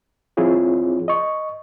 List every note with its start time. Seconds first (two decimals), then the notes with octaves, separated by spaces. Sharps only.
0.37 F3 C4 E4 F4 G#4 C#5
1.08 D#5 C#6